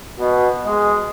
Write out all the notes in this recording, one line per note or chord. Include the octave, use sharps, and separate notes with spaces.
B2
G#3